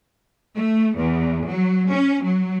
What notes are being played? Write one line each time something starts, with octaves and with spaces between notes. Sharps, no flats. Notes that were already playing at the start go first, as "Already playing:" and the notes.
A3
E2
F#3
C#4
F#3